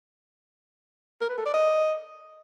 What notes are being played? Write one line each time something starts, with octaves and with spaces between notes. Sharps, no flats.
A#4
B4
A4
D5
D#5